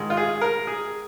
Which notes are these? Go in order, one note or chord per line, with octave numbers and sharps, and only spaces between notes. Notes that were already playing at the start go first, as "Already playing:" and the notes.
Already playing: G#2 D#3 G#3
F4
G#4
A#4
G#4